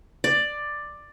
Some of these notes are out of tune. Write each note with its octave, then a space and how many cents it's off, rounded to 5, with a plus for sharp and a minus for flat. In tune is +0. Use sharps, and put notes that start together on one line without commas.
D5 +10